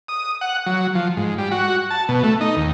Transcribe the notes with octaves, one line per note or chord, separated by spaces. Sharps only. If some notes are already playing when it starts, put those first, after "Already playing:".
D#6
F#5
F#3
F3
G#2
G3
F#4
A5
B2
A3
D#4
D#2